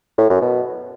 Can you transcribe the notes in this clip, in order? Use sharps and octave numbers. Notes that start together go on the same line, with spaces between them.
A2
F#2
B2